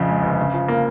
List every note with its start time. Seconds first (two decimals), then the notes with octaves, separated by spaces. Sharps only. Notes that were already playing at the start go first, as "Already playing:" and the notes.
Already playing: A#1 F2 C#3
0.08 G#3
0.22 G1
0.38 C#3
0.53 F3
0.68 A#3